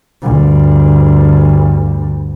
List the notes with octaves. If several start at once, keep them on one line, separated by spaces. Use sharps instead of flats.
D2 G2